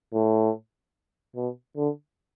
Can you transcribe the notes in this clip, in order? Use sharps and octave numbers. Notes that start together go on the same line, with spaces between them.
A2
B2
D3